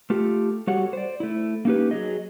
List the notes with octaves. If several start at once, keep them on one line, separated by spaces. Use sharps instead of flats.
A3 F4 G4 A4
G3 F#4 G4 A4 C#5 F#5
C5 D5
A3 E4
A#3 C#4 D#4 G4 B4
F#3 G#4 D#5